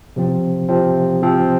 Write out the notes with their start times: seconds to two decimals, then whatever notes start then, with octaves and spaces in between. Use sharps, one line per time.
0.16 C3 F3 C4
0.69 C3 F3 C4
1.22 C3 F3 C4